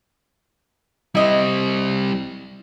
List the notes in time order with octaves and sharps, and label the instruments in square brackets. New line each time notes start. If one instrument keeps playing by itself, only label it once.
[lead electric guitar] G3 C4 [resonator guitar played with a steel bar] E4 D#5